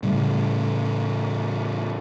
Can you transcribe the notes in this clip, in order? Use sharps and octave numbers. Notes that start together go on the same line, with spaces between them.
A2 C#3 G3